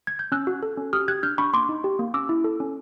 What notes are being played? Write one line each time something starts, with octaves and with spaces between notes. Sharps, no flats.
G#6
G6
C#4 E6 F#6
F#4
A4
C#4
G4 D#6 F6
G4 F#6 G#6
D4 F6 G6
D4 B5 C#6
A#3 C6 D6
D#4
G4
A#3
C#4 D6 E6
E4
A4
C#4